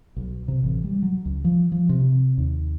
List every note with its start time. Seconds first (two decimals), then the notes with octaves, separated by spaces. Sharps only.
0.17 B1
0.48 C3
0.63 A1
0.84 G3
1.03 F#3
1.25 C#2
1.44 F3
1.72 F3
1.89 C3
2.38 D#2